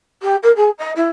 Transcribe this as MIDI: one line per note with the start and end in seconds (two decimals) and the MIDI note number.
0.22 0.35 67
0.42 0.51 70
0.56 0.69 68
0.78 0.91 75
0.95 1.08 64